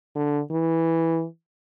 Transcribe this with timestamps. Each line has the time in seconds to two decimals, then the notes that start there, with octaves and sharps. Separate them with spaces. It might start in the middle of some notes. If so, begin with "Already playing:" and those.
0.16 D3
0.51 E3